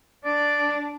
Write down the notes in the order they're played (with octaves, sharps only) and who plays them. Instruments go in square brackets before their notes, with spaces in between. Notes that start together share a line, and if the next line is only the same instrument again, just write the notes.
[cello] D4 [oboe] D5